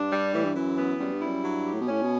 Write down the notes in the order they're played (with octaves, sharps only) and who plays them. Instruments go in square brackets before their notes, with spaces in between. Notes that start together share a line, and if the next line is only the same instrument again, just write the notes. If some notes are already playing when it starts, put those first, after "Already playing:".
Already playing: [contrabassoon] G2 [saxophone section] D4
[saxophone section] G3
[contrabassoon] A2 [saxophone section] E3
[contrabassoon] G2
[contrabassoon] F#2 [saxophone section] E3
[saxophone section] B3
[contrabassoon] F#2 [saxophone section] G3
[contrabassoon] G2
[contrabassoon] F#2 [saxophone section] E4
[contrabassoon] G2 [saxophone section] F#3
[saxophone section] G4
[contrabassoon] A2
B2
[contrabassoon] A2 [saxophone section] C#4
[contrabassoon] B2